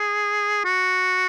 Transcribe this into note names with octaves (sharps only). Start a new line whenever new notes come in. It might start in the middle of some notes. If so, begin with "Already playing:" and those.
Already playing: G#4
F#4